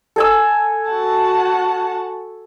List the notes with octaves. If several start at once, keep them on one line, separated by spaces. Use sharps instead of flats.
A4 G#5 E6
F#4 F#5 A5